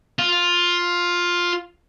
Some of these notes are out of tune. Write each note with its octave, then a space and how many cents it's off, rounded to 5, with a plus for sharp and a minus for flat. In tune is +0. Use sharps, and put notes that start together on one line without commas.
F4 +10